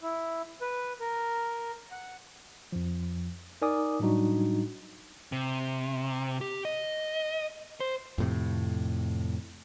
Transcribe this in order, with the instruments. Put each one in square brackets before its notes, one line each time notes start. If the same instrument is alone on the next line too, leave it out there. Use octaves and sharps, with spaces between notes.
[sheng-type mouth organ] E4
B4
A#4
F#5
[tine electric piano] F2 F3
D#4 A#4 D5 G#5 D6 D#6
A2 F#3 G3 D4 D#4 F#4
[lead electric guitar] C3
G4
D#5
C5
[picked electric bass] F2 A2 C3